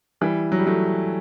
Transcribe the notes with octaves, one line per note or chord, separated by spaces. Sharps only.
E3 G3
F#3
G3
F#3 A3